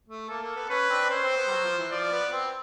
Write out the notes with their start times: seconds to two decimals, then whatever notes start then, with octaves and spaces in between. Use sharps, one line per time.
0.08 A3
0.29 A#3 A4
0.42 A#3
0.56 B3
0.70 C#4 B4
0.90 C4 D4
1.10 C#4 C5
1.24 C4
1.37 B3
1.47 G3
1.51 F#3
1.64 F3
1.78 E3
1.91 F3 D5
2.12 B3
2.32 C4